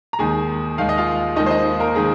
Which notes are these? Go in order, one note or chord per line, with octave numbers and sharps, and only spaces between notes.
A#5
D#2 D#3 G#3 G#4 G#5
D#2 D#3 G#3 F5
D#5
F4 F5
D#2 D#3 G#3 D#4 D#5
C5
D#4 D#5
A#3 A#4
D#3 G#3 G#4